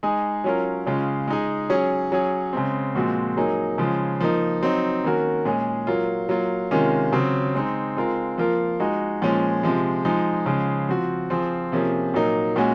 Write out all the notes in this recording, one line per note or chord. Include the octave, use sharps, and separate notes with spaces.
G#3 D#4 G#4
F#3 C#4 F4 A#4
C#3 G#3 C#4 F4
G#3 D#4 G#4
F#3 C#4 G#4
F#3 C#4 G#4
C#3 G#3 C4
A#2 F3 G#3 C4 F#4
F#3 A#3 D#4 G#4
C#3 F3 G#3
F3 A#3 D#4
F#3 C4 D#4
D#3 A#3 C#4 F#4 A#4
A#2 G#3 C#4 G#4
F#3 A#3 F4
F#3 A#3 F4
C3 D#3 G#3 C#4 F4
C#3 F#3 C4
G#3 C4 D#4
G#3 C4 F4 A#4
F3 A#3 F4 A#4
G#3 D#4 F#4
A#2 F3 G#3 C#4
C3 F3 G#3
F3 G#3 D#4
C#3 F3 G#3
F3 C4 F#4
F3 C4 F4 G#4
C3 F3 A#3 C#4 G#4
A#2 F#3 A#3 D#4
A#2 G#3 C#4 F#4